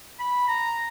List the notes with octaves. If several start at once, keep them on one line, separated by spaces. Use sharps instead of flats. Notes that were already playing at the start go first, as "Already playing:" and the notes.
B5
A#5